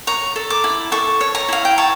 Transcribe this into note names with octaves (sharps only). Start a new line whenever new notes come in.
C#5 A#5
A4
D6
E4
A4 C#6
C#5
A#5
E4 F5
G5
C#5 A5